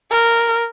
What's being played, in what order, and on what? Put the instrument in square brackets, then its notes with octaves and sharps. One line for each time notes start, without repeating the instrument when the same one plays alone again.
[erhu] A#4